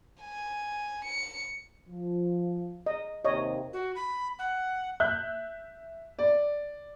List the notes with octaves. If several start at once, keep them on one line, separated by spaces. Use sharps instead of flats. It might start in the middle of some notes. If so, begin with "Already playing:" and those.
G#5
C#7
F3
D#5
D#2 C3 C#5 D#5
F#4
B5
F#5
E5 F#6 G6
D5